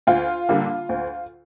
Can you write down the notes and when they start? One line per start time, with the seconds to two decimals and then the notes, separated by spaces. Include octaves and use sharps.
0.07 D2 F4
0.49 D3 G3 A#3
0.89 D2